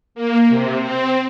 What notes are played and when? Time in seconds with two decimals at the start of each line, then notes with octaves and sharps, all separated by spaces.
0.15 A#3
0.49 C3
0.80 C4